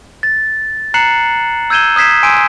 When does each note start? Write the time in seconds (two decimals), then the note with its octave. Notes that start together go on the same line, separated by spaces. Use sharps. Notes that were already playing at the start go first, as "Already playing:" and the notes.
0.23 A6
0.94 A#5 F#6 C7 C#7 E7 F#7
1.70 E6 G6 G#6 D#7 E7 G7
1.96 D#6 F#6 G#6 B6 C7 E7
2.23 G#5 C6 E6 G6 D7 D#7